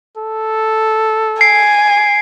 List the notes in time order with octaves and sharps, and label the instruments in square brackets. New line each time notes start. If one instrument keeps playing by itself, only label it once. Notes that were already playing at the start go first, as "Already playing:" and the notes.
[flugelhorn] A4
[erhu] G#5 [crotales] C7 D7